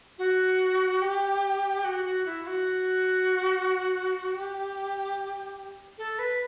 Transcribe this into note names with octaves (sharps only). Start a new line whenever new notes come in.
F#4
G4
F#4
F#4
E4
F#4
G4
A4
B4